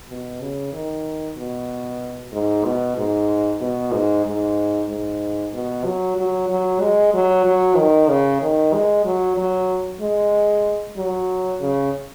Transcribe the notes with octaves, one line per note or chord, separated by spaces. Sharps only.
B2
C#3
D#3
B2
G#2
B2
G#2
B2
G#2
G#2
G#2
B2
F#3
F#3
F#3
G#3
F#3
F#3
D#3
C#3
D#3
G#3
F#3
F#3
G#3
F#3
C#3